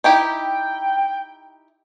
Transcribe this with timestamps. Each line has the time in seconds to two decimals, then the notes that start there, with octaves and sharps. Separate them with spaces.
0.04 D#4 E4 G4 G5